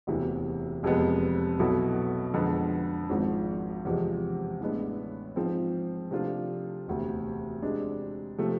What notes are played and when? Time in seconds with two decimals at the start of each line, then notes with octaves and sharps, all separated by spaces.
0.07 E1 D2 C3 E3
0.83 F1 F2 C3 G#3 B3
1.59 B1 B2 B3 E4 A4
2.34 F2 D3 G#3 B3
3.09 G#1 G#2 F3
3.85 E2 C3 F3 G#3
4.61 A1 A2 G#3 B3 D4
5.36 G#2 F3 G#3 C4
6.11 C3 F3 A3 D4 F4
6.87 E1 D2 C3
7.62 C3 G#3 D4
8.38 C3 F3 A3